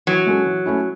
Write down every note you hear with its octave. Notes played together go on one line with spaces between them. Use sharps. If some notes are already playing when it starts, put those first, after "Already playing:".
E3 F#3
G#3 C#4 F#4 A4
E3
A3 C#4 E4